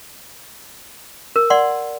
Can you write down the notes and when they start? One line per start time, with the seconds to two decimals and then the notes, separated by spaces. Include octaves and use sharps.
1.36 A#4
1.50 D5 F#5 C6